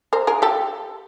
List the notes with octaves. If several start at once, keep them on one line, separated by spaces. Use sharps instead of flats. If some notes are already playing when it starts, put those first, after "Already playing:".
A#4 C5
G#4 A#4
G4 A4